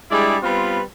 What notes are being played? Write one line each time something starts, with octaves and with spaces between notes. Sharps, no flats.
G3 G#3 D4 E4 G#4
G3 B3 C4 F4 B4